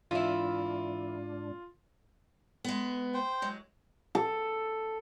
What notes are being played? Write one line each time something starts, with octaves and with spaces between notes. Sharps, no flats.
G#2 E3 D4 E4 F4
G#3 B3
C5 G5
F#3 G#3
A4